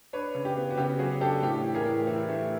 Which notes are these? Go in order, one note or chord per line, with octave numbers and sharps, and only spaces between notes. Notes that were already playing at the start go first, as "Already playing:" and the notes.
D4 B4 C#5
C#3
G4
B3
F#4
C#3 G4
F#3 F#4 G#4
D4 G4 A4
A2 G4
E3
G#4 A#4
A2
E3
A3